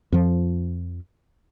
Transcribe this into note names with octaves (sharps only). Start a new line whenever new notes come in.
F2 F3